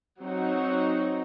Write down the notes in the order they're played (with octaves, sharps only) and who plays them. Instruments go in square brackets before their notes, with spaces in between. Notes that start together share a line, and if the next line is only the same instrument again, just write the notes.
[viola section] F#3 C4 D#4 F#4